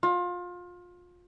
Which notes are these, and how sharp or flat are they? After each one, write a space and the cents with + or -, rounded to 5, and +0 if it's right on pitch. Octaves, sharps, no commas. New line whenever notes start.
F4 +25